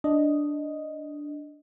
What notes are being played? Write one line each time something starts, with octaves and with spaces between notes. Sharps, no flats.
D4 D#5